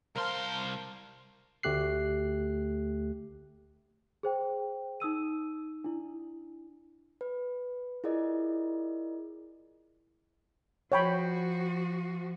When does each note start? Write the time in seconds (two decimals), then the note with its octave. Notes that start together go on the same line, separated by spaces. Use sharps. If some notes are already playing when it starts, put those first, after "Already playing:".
0.16 C2 A#4 C5 F5 A5 C6
1.63 D2 A3 G4 F#6 C7
4.23 G#4 C5 G5
5.00 D#4 D#6 E6 D#7
5.84 D4 E4
7.21 B4
8.04 E4 F4 G#4 A#4 D5 D#5
10.92 F3 F#4 C#5 G5 B5